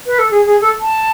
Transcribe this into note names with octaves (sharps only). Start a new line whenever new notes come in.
B4
A4
G#4
G#4
A4
A5